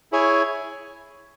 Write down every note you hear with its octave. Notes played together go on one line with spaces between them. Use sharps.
E4 G#4 C#5 G#5